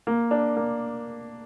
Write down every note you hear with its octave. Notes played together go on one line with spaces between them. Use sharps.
A#3
D4
A#3